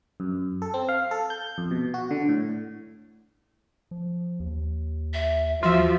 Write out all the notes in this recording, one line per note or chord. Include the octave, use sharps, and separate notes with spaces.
F#2
A4
C4
F5
A4
G6
F2
B2
F#4
D3
A2
F3
D#2
E5
D#2 F3 F4 F#4 E5